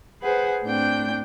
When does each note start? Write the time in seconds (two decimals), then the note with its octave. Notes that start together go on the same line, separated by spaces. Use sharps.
0.22 G#4 B4 C5 F#5
0.65 A2 C4 D4 G5 G6